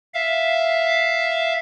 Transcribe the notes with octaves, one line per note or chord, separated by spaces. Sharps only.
E5 F5